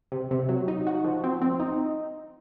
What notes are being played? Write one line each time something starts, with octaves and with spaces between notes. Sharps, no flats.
C3
C3
F#3
D#4
F#4
F3
C4
C4
D#4